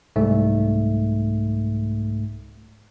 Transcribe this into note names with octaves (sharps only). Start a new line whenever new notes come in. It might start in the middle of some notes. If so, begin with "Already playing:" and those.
C2 G#2 A3